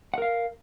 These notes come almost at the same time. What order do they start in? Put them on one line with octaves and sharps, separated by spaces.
F#5 A#4 F5